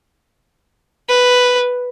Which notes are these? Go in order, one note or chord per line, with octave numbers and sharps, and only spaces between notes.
B4